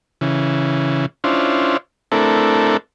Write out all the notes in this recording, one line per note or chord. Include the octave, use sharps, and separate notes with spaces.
C#3 E3
C#4 D4 E4 F4 C5
A3 C4 D4 E4 A4 A#4